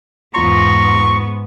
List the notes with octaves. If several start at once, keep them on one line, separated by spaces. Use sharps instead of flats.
E2 G#2 B3 F4 A#5 C6 C#6